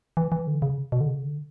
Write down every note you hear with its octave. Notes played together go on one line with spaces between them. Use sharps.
E3
E3
D3
C#3
B2
D3
C#3
D3